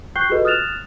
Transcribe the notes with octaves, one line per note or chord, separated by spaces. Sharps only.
G5 C#6 F#6 G6 C7 G7
F4 F#4 G#4 A4 B4 D#5
D#6 F6 F#6 A6 E7 F7